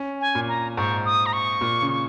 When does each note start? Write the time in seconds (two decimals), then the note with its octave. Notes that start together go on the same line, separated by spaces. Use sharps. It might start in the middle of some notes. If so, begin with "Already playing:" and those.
Already playing: C#4
0.21 G#5
0.35 A#2
0.48 A#5
0.77 G#2 C#6
1.05 D#6
1.26 A#5
1.33 C#6
1.61 A#2
1.82 C#3